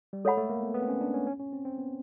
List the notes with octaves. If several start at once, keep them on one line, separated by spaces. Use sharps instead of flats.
G3
G#3 A4 C#5 F#5 B5
A3
A#3
B3
B3
C4
C#4
D4
C#4
C#4
C#4
C4
C4
B3